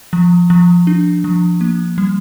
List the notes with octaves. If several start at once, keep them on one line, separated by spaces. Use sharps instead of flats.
F3
F3
D4
F3
A#3
G3